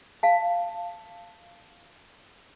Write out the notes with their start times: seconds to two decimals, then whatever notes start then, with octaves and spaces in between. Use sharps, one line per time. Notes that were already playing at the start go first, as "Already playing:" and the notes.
0.23 F5 A5